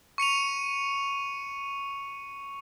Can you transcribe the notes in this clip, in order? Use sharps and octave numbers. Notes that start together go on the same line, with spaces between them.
C#6 C#7 D#7 F7